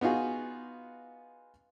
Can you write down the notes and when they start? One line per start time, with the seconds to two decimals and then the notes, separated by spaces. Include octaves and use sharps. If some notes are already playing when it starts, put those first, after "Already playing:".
0.01 B3 D#4 F4 F#4 G#4